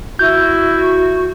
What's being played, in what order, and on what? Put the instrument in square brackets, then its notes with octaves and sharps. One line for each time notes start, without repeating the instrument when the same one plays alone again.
[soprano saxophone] E4 [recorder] F#4 [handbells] G6